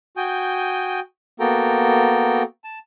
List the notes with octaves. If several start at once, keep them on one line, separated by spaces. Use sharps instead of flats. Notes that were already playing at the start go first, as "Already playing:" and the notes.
F#4 G5 G#5 D#6 G6
A#3 B3 F#4 A4 G5 A#5
A5